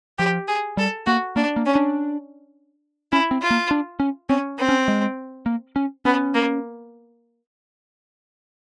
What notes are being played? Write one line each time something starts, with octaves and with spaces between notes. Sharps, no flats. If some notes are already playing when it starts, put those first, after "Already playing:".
F3 G4
G#4
G3 A4
A#3 F#4
A#3 D4
A#3
C#4
D4
C#4 E4
C4
F4
A#3
D4
C#4
C4 C#4
C4
C#4
G#3
A#3
C#4
B3 C#4
A#3